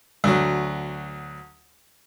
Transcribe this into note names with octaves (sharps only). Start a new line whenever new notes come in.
D2 F#3